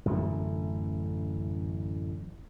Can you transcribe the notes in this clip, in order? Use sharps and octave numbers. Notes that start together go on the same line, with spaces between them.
A1 F#2 D3 A3